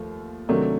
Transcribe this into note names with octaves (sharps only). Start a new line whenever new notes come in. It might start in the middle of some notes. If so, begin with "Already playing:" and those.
Already playing: D#2 F3 A3
C3 D#3 F#3 A3 D4